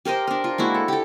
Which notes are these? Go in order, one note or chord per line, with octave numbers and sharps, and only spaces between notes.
G4 A#4 C5 D#5
D4 A#4
F4
G#3 A#3 E4 F#4
A4
G4 A4